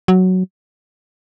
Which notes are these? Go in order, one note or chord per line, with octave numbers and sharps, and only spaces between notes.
F#3